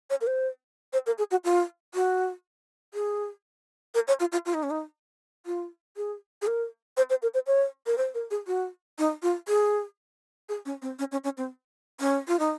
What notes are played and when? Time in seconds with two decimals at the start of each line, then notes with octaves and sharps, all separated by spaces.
0.10 C#5
0.21 A#4
0.27 C5
0.93 C5
1.07 A#4
1.18 G#4
1.31 F#4
1.44 F4
1.95 F#4
2.94 G#4
3.95 A#4
4.08 C#5
4.20 F4
4.32 F4
4.46 F4
4.54 D#4
4.63 C#4
4.71 D#4
5.46 F4
5.97 G#4
6.42 G#4
6.47 A#4
6.97 C5
7.10 C5
7.22 A#4
7.34 C5
7.47 C#5
7.86 A#4
7.98 C5
8.14 A#4
8.31 G#4
8.47 F#4
8.99 D#4
9.23 F4
9.48 G#4
10.49 G#4
10.66 C#4
10.82 C4
10.99 C#4
11.12 C#4
11.24 C#4
11.37 C4
12.00 C#4
12.28 F4
12.39 D#4